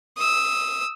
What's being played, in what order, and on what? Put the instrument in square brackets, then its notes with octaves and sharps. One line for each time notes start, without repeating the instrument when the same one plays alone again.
[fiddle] D#6 E6